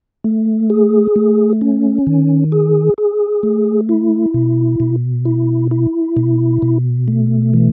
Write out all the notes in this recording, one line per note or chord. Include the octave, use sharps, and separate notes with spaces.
A3
G#4
A3
C#4
D#3
G#4
G#4
A3
E4
B2
B2
E4
E4
B2
B2
A3
E3